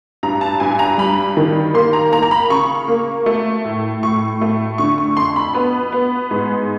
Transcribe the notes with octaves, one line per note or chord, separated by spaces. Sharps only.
G2 A#5
A5
G2 G#5
A#5
G3 B5
D#3
A#3 C6
A#5
A#3 A#5
A#5
B5
C#3 C#6
A#3
A3
A2
A2 C#6
A3
D3 C#6
C#6
F2 C6
B5
B3
B3
G#2